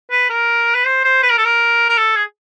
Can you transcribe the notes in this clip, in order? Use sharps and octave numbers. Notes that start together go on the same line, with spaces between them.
B4
A#4
B4
C5
C5
B4
A#4
A4
A#4
A#4
A4
G#4